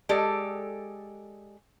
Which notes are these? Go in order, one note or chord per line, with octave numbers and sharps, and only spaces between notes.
G#3 G4 A4 D5